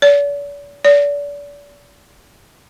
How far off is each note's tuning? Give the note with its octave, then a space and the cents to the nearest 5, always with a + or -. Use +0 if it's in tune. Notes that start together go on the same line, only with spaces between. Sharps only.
D5 -45
D5 -35